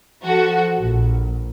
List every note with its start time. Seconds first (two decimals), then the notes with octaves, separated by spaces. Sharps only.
0.23 F3 F#4 A4
0.81 A#1